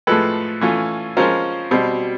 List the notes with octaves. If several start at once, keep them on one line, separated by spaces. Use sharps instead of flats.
A2 F3 G#3 A4 B4
E3 A3 C#4 F4
F3 G#3 C#4 F4 A#4 C5
B2 G3 C4